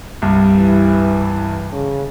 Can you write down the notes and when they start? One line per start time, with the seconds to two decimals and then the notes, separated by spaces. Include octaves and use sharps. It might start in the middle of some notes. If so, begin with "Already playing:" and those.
0.22 C2 G2
0.58 E3
1.73 C#3